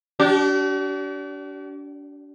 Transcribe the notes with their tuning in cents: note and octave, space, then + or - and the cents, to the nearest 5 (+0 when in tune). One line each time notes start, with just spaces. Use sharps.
D4 -35 G4 -45